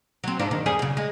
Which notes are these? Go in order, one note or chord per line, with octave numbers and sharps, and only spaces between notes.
F#3 C4
G#2 F3 D4
D#3
F2 G3 G#4
F#2 C#3
G#3